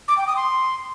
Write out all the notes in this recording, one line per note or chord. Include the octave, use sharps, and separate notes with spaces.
D6
G5
D#6
C6